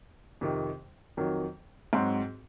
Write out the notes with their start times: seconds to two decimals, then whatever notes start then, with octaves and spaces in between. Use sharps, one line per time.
0.41 F2 C3 D#3
1.17 F2 D#3 F#3
1.93 G#2 F#3 C4 F#4